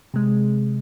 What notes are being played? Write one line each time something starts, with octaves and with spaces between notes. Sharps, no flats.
C3 G#3